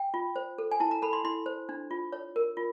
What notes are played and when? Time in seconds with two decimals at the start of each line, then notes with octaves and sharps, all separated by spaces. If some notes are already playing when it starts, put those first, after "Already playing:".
Already playing: G5
0.14 F4
0.36 C5
0.58 A4
0.71 G#5
0.80 E4 A5
0.91 A#5
1.02 A4 B5
1.13 C6
1.24 E4 C6
1.46 C5
1.69 D4
1.91 F4
2.12 C#5
2.36 A#4
2.57 F4